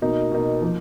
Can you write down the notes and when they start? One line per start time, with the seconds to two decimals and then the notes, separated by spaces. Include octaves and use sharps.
0.02 B2 A#3 D#4
0.32 B2 A#3 D#4
0.62 F3 A#3